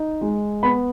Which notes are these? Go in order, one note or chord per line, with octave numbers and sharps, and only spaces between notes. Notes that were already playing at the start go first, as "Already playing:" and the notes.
Already playing: D#4
G#3
B3 B5